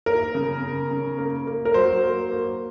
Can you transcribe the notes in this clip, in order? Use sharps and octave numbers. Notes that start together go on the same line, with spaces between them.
A#3 A#4
C#3
C#3
C#3
A#3
A#3
A#4
F#3 C5
A#3
A#3